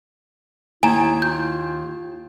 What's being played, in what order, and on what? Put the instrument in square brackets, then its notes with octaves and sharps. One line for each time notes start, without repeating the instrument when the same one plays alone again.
[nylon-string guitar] D#2 [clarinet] E4 [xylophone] G#5 A#5
[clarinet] F4 [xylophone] G6